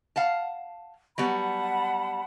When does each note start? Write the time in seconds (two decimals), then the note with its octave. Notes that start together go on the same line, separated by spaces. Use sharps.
0.16 F5 F#5 A5
1.18 F#3 G3 B3 F#5 A5 B5